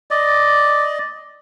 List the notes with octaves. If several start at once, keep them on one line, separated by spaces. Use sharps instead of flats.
D5 D#5